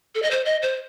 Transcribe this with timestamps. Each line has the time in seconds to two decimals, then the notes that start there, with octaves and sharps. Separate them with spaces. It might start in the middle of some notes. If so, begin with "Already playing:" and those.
0.15 A4
0.23 D#5
0.31 C5
0.45 D#5
0.62 C5